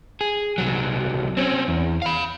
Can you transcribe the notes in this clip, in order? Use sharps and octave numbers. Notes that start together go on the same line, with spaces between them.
G#4
C2 F#3
C4 C#4
E2
F5 B5